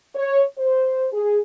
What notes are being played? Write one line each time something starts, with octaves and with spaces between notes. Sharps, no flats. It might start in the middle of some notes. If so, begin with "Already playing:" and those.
C#5
C5
G#4